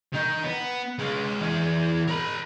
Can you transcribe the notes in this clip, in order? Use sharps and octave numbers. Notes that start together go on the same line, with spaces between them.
D#3 D#4
B3
G#3 F5
E3 G#4
A#4 B5